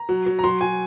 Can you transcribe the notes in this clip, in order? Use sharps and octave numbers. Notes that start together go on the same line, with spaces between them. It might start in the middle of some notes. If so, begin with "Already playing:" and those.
Already playing: A#5
F#3
F#3
A#5
F#3 C6
F#3 G#5